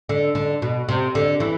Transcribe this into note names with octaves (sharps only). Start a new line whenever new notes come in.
D3
D3
B2
C3
D3
E3